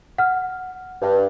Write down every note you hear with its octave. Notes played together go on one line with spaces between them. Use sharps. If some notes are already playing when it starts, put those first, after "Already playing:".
F#5 F6
G2